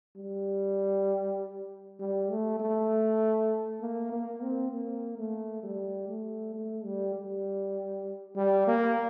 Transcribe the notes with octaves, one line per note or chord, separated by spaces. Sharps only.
G3
G3
A3
A3
A#3
A#3
C4
A#3
A3
G3
A3
A3
G3
G3
G3
A#3